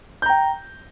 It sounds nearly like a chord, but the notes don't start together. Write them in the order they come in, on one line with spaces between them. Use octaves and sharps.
G6 A#5 G5